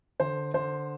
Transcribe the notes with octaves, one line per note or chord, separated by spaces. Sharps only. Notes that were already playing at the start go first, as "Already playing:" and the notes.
D3 C5
D3 C5